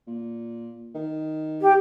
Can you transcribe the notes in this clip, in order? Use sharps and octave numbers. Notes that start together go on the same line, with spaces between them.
A#2
D#3
G4